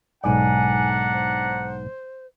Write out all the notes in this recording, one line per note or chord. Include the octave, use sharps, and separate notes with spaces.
B1 G#2 D4 D5 F#5 G#5 A#5
C5